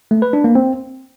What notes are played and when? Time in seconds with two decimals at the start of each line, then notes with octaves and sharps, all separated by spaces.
0.11 A3
0.22 B4
0.33 D4
0.44 A#3
0.55 C4